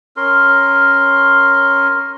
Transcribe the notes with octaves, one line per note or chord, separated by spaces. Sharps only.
C#4 A#4 C6